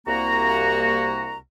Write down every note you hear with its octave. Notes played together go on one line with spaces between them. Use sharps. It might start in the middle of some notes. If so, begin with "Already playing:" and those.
C2 A#3 F#4 A#5